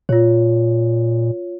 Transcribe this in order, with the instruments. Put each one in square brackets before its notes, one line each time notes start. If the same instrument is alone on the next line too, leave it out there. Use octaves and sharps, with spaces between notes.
[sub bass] A#2 [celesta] F4 C#5